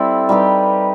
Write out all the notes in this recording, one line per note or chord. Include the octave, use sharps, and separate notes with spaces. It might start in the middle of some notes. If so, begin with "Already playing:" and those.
Already playing: G3 C4 E4 A4
G3 D#4 G4 B4